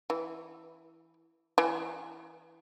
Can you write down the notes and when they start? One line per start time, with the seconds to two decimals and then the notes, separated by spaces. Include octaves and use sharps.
0.10 E3
1.58 E3